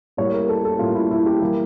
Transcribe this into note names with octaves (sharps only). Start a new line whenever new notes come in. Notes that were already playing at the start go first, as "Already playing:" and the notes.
A2 G3 A#3 C#5
A#4
A4
A4
A2 G3 A#3 F4
E4
E4
G4
E3 G3 A#3